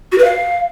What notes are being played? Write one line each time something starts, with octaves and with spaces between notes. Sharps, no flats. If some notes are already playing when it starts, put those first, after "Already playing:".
F#4
B4
F5